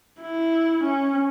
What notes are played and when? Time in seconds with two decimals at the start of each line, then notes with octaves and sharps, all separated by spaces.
0.21 E4
0.84 C#4